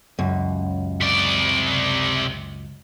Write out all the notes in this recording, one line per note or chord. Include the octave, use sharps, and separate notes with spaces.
C#2 F#2
C3 D5